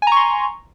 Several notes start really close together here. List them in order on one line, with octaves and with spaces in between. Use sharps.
G#5 A#5 C#6 C6